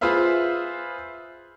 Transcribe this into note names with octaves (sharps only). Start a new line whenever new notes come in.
F4 G#4 B4 C5 E5 F5